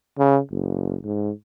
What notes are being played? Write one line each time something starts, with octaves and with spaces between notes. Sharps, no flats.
C#3
F#1
G#2